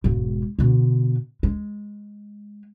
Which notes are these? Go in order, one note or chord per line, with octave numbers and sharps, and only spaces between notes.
E1 G#2
B2 D3
G#3